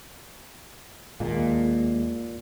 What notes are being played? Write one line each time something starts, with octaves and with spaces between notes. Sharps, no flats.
D#2 A#2 G#3 A#3